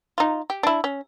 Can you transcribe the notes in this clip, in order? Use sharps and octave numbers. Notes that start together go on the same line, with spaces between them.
D#4 F4
G4
D4 E4
C#4